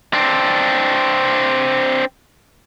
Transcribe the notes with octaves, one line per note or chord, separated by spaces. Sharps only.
C4 D4